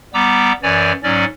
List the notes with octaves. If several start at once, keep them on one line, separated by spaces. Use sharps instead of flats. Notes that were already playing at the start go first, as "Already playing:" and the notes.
G3 B3 A#5 D6 E6
F#2 E3 C#5 D5 G#5
G#2 F#3 C#4 D5